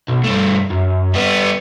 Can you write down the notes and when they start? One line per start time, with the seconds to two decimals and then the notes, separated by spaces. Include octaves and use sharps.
0.08 B1
0.24 G2 A3
0.70 F#2
1.14 G3 B3